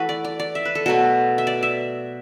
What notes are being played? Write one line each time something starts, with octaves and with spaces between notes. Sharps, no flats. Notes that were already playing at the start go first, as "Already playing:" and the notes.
Already playing: E3 A3 F#4 A4 B4
D5
D5
D5
E5
B4
A4
B2 F#3 A3 A4
E5
D5
E5